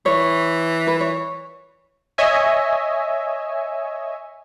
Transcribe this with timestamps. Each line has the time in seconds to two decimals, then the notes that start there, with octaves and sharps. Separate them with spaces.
0.06 E3 C#5
0.87 B4
1.01 C#5
2.18 C#5 D#5 E5 G#5